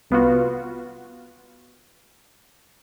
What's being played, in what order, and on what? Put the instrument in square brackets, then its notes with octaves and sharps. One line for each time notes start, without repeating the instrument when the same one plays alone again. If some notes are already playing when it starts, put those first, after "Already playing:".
[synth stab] C2 B3 F4 F#4